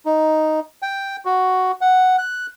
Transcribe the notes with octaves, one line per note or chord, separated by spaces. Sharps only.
D#4
G5
F#4
F#5
F#6